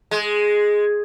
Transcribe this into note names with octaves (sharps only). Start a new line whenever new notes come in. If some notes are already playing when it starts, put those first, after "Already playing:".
G#3